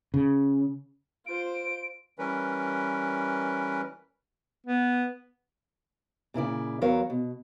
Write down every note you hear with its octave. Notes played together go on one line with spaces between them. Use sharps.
C#3
F4 C5 D7
E3 G3 C#4 A#4 B4
B3
A#2 C#3 E4 D5
E2 F#3 A#4 C#5 F5
B2